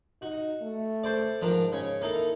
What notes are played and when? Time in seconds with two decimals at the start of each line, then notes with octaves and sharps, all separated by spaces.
0.22 D#4 F#4
0.62 A3
1.03 A4 C5 D5
1.41 G#2 F3 D4 A#4
1.72 C#3 C#5
2.02 A#3 D#4 E4 A4